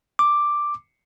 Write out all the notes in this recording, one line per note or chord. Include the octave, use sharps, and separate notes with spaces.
D6